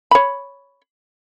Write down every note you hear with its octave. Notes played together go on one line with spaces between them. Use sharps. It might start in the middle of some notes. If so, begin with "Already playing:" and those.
C#5 B5